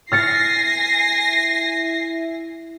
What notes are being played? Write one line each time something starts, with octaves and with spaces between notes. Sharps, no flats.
E4 G#5 F6 A6 A#6 C7 C#7